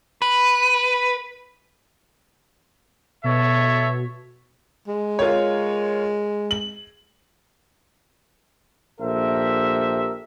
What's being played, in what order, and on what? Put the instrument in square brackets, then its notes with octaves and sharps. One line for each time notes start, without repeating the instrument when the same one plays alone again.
[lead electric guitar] B4
[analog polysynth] B2 [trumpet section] A4 C#5 E5
[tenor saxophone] G#3
[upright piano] F4 A#4 C#5
F#7
[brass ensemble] A#1 G4 A4 A#4 C5 E5